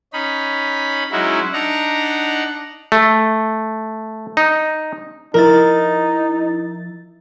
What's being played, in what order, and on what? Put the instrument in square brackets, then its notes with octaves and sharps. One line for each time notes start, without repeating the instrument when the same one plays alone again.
[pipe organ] C#4 D#4 B5
F#3 G#3 C#4 D#4 E4 F#4
D4 D#4 F#5 A#5
[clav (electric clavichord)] A3
D#4
[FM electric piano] F3 E4 A6 [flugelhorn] D#4 [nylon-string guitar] A#4